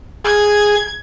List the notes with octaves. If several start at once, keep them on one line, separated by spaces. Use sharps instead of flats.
G#4 G#6